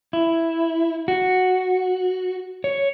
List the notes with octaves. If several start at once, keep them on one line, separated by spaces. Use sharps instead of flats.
E4
F#4
C#5